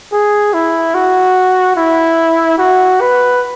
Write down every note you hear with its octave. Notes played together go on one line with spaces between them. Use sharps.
G#4
E4
F#4
E4
F#4
B4